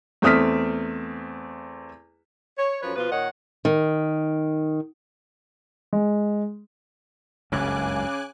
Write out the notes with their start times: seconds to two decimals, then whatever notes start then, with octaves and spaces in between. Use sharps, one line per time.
0.22 E2 A3 C4 D#6 F6 B6
2.57 C#5
2.81 F#2 F3 B4 C#5
2.96 B2 F3 F4 B4
3.11 A#2 D#3 C#5 D#5 F#5
3.65 D#3
5.93 G#3
7.52 F#1 C#2 G2 C#3 G#5 D6 F#6